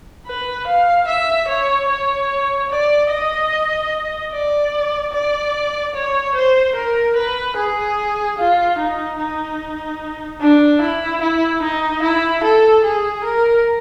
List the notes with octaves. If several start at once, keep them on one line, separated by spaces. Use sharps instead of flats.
B4
F5
E5
C#5
C#5
D5
D#5
D5
D5
C#5
C5
A#4
B4
G#4
F4
D#4
D#4
D4
E4
E4
D#4
E4
A4
G#4
A#4